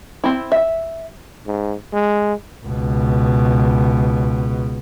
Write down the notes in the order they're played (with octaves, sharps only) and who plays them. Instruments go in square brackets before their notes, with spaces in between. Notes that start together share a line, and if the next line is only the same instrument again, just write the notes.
[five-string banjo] C4 E4
E5
[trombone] G#2
G#3
[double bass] C#2 B2